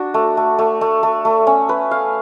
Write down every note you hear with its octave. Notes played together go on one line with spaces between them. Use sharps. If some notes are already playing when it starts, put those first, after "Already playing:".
Already playing: D4 F#4
A3
A3
A3
A3
A3
A3
C#4
B4
F5